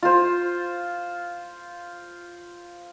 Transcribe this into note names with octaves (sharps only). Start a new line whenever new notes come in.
F4 C5